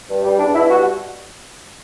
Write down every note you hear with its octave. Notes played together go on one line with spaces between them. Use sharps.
G2
G3
E2 D4
B2 E4
G3 F#4